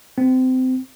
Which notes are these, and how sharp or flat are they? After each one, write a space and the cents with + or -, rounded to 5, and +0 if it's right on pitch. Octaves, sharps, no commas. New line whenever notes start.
C4 -25